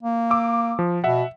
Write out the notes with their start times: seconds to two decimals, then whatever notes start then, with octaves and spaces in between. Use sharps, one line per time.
0.03 A#3
0.30 D6 E6
0.79 F3
1.04 B2 E5 F#5